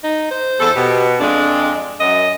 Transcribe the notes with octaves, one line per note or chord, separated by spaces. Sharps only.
D#4
C5
E2 A4
B2 G4
F2 G#3 D4
F#2 D#5